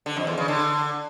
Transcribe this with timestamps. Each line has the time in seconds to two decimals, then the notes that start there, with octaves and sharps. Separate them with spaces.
0.06 D3
0.17 F2
0.27 E2
0.38 C#3
0.48 D3